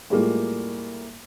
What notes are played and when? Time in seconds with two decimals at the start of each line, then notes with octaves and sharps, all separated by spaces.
0.10 A2 G3 G#3 A#3 F4